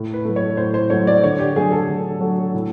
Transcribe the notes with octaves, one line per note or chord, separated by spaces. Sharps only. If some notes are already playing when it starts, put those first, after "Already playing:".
Already playing: A2
B4
F#3 A3
C#5
A2 C5
C5
F#3 A3 C#5
D5
D3 C#5
G4
F#3 A3 G#4
A4
D3
F#3 A3
A2